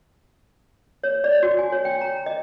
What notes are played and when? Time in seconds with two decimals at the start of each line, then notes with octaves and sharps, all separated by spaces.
1.04 C#5
1.24 D5
1.43 F#4
1.59 G#5
1.72 C#5
1.85 G5
2.01 A#5
2.26 D#5